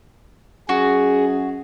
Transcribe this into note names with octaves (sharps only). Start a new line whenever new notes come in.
F#2 F#4 G#4